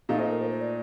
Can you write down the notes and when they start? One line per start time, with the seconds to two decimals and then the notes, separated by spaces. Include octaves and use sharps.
0.09 A#2 F3 A3 D#4 F5
0.19 C5
0.31 A#4
0.40 C5
0.51 C5
0.61 D5